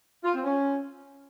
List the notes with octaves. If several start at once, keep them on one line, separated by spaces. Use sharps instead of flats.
F4
C4
C#4